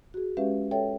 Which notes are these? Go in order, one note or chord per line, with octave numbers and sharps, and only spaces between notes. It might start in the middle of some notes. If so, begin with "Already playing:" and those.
F#4 G#4
G#3 C#4 G4 B4 E5 F5
A4 C#5 E5 G5